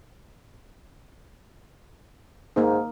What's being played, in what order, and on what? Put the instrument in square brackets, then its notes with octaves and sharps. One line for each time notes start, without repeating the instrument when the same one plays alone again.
[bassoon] G#2 [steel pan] A#3 D#4